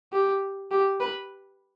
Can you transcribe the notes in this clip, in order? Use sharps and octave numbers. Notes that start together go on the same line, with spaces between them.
G4
G4
B4